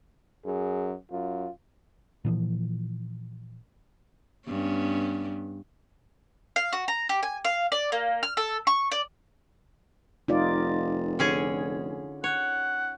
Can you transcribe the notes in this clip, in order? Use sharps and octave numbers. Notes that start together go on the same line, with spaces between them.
F#2 G#4
F#2 F4
A#2 E3 F3
G2 B3 C#4
F5
F#4
A#5
G4
G#5
F5
D5
A#3
F6
A4
C#6
D5
F1 D#4 F4 D5
D3 C#4 G#4
C#5 F#5